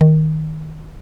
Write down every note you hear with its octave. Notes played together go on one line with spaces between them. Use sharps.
D#3